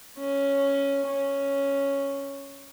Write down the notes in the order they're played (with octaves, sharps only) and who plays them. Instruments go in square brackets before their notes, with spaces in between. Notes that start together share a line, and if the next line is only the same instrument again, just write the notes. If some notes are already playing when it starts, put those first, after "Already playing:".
[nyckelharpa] C#4
C#4